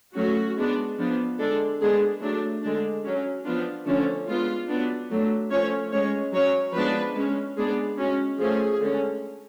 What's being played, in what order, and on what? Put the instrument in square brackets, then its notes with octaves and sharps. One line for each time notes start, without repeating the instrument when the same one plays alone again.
[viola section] F#3 A3 C#4 F#4
G#3 B3 D4
F3 B3 D4
D3 G#3 D4 A4
D3 G#3 B3 D4 G#4
F#3 A3 D4
D3 G#3 D4
F#3 C#4
F3 B3 D4 F4
D3 F3 A3 C#4 D4
G#3 B3 D4 F4
F#3 B3 D4
F#3 A3 D4
F3 A3 C#4 C#5
G#3 C#4 C#5
F#3 C#4 C#5
F3 G#3 B3 D4 B4
G#3 C#4
G#3 B3 D4 G#4
G#3 C#4 F#4
F3 A3 C#4 G#4
D3 G#3 C#4